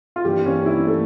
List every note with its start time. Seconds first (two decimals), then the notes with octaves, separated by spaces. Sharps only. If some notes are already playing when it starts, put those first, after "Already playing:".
0.16 F4
0.25 G2 E3 A#3 D4 G4
0.46 C#4
0.66 E4
0.87 A3